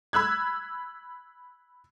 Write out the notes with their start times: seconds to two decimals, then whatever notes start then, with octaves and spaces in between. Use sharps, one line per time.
0.13 B5 E6 F#6 G#6